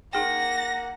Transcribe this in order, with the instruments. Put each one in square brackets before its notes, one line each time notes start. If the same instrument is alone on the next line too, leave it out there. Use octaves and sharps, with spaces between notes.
[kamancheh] A#3 F#5 [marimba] D#4 G#4 G5 [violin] A#6